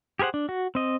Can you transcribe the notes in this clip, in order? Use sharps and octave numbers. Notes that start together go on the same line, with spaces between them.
G4 G#4 A#4 C5 F#5
D4
F#4
C4 D#5